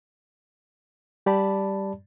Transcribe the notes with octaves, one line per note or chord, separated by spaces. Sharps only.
G3 G4 D5 A5 B5